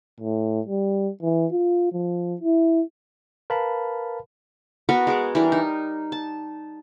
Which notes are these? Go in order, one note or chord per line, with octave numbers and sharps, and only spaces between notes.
A2
G3
E3
F4
F3
E4
A#4 B4 F5 A5 B5
B3 F#4 A#4 B4
G#3 G#4 D6
E3 G3 D4 A#4
D#4
A5